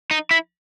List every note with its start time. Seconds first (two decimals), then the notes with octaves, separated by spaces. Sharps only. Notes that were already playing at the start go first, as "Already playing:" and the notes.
0.11 D#4
0.31 E4